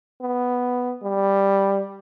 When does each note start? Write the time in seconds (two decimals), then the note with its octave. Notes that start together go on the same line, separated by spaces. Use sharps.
0.22 B3
1.03 G3